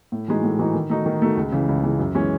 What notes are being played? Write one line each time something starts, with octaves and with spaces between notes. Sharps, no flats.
A2
E3 G#3 D#4 F#4
A2
E3 G#3 D#4 F#4
D#3
A3 D#4 F#4
D#3
A3 D#4 F#4
C#2
C#3 E3
C#2
C#3 E3
F#2
E3 G#3 C#4